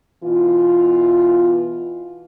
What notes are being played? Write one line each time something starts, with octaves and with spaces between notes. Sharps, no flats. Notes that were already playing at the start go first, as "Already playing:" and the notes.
B2 E3 F4